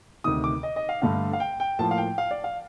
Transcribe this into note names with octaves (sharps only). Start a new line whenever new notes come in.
D2 C3 D#3 D#6
D6
D#5
D#5
F5
G2 D3 A3 D4 F5
F5
G5
G5
A2 F3 A#3 A5
F5
G5
F5
D5
F5